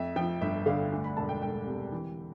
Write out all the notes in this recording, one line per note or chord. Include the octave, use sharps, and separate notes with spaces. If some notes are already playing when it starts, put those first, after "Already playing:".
Already playing: F2 E5
F3 G5
G1 E5
D3 F5
D2
B5
E1 A5
G5
E1 G5
C3
E3